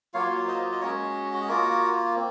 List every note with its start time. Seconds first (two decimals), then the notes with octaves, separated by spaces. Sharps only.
0.14 F#3 A#3 F4 C#5 F5
0.48 C5 D#5
0.72 D#5
0.81 G#3 C#4 F#4 A#4 C#5
1.34 F#4
1.41 G#4
1.48 A#3 F4 F#4 A#4
2.16 C4